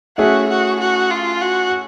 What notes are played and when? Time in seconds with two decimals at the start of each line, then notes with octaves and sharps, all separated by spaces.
0.18 A3 C#4 E4 F#4 G#4
0.49 F#4
0.80 F#4
1.11 F4
1.41 F#4